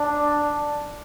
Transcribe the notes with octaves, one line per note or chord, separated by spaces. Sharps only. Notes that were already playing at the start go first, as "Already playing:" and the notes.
Already playing: D4